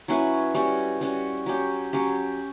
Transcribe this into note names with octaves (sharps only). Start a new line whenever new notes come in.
F#3 C#4 E4 B4
G3 C#4 F#4
G3 C#4 F#4
F#3 C#4 G4
F#3 C#4 G4